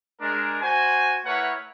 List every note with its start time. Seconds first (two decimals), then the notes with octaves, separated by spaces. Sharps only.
0.21 G#3 D4 A#4
0.62 F#4 C5 G#5
1.26 A3 E4 A#4 B4 C#5 F#5